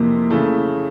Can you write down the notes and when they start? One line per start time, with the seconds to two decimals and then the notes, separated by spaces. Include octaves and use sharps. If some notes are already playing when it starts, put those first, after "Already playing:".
Already playing: F2 C3 E3 A#3
0.30 C#3 E3 A3